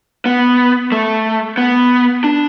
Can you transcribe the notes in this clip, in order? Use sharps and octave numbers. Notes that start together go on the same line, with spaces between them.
B3
A3
B3
D4